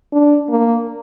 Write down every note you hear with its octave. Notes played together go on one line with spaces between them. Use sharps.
D4
A#3